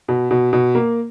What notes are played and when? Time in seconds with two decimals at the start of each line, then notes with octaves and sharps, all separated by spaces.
0.08 B2
0.31 B2
0.53 B2
0.75 A#3